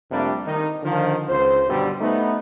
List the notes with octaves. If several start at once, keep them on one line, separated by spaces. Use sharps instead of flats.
F2 C3 G3 A3 A#3 D4
D#3 D#4
D3 D#3 F3
C#2 C5
G2 B2 D3 F#3 G3
A3 B3 D#4